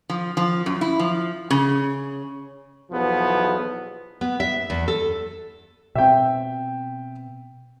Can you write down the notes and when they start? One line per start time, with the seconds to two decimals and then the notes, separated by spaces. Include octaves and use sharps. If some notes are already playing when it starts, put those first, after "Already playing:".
0.10 F3
0.37 F3
0.66 F#2
0.81 E4
0.99 F3
1.50 C#3
2.91 B1 E2 F3 B3
4.21 B3
4.40 E5
4.70 E2
4.88 A4
5.95 B2 C4 E5 G5